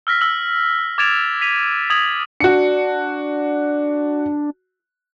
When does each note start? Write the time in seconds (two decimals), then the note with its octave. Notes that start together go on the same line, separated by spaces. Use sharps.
0.07 E6 F6 A#6 B6
0.21 E6 F#7
0.98 D6 G#6 A6 D7 E7 F7
1.41 B6 D#7 F7
1.90 D#6 G#6 F7 F#7
2.40 D4 F#4 C#7